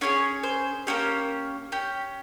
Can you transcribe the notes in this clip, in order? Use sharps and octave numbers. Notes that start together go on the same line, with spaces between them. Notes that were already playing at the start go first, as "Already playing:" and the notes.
C#4 E4 G#4 C#5
C5
A#3 C#4 G4 C#5
C#4 G4